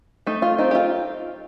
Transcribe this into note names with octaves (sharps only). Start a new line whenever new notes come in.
A3 D#4
F4
C4 D#4
G4
F4